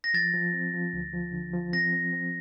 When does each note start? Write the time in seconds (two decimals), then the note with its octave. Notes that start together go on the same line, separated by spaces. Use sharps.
0.04 A#6
0.14 F3 A6
0.34 F3
0.53 C4
0.74 F3
0.93 D2
1.13 F3
1.32 D3
1.53 F3
1.73 C4 A#6
1.92 C4
2.13 C4